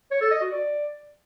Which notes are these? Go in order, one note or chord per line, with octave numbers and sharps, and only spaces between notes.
C#5
A4
D#5
F#4
D5